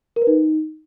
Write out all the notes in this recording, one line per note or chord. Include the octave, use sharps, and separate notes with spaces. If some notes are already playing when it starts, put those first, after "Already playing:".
A#4
B4
D#4